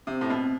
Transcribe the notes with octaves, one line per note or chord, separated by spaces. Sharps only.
C3 C4
A2
B2